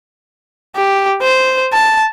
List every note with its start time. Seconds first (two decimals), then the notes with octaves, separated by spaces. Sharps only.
0.76 G4
1.21 C5
1.73 A5